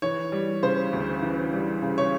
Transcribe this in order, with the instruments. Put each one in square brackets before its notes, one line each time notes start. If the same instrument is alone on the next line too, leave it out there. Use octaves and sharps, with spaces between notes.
[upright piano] E3 C#5
G3
C#3 C5
D2
E3
G3
C#3
C#5